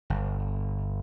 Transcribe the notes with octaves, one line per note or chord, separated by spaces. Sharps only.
G1